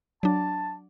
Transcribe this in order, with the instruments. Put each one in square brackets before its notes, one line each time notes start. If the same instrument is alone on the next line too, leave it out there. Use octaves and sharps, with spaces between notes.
[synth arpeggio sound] F#3 D4 [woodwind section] A5